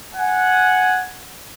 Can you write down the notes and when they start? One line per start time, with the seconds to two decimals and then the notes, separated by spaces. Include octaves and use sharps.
0.15 F#5 G#5